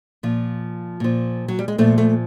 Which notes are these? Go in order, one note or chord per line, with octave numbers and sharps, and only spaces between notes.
A#2 F3
A#2 F3
F#3
G3
G#3
A#2 F3 A3
A3